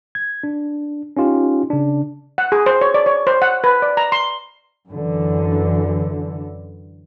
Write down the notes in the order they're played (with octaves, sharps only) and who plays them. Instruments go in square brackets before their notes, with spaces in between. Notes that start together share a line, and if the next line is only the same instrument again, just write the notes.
[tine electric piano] G#6
D4
C#4 D#4 F4 G4
C#3 D4
[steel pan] F#5
G#4
C5
C#5
D5
C#5
C5
F#5
B4
D5
A#5
C6
[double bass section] F#2 D3 E3